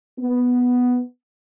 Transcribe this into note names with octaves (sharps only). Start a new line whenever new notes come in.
B3